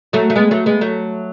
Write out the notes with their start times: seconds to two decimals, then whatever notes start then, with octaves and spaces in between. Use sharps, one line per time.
0.13 F#3 A3
0.30 A3
0.36 G#3 B3
0.51 F#3 A3
0.66 G#3 B3
0.81 F#3 A3